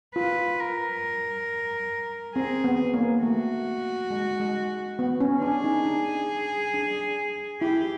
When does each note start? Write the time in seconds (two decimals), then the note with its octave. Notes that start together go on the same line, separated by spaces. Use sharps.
0.15 F4 B4
0.60 A#4
2.36 C4 G#4
2.64 B3
2.94 A#3
3.23 A3 F#4
4.11 G#3
4.40 G#3
4.99 B3
5.20 C#4
5.42 D4 G#4
5.64 D#4
5.86 D4
6.74 D4
7.61 E4 G4